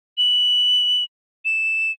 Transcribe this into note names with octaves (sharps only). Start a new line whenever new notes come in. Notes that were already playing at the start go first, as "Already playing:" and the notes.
F#7
E7